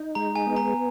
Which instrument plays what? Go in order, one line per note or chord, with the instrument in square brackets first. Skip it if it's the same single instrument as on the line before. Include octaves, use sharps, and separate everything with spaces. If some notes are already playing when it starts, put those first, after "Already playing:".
Already playing: [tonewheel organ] D#4
[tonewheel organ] G#3 [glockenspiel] A#5
[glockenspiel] G#5
[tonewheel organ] B3
[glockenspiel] A#5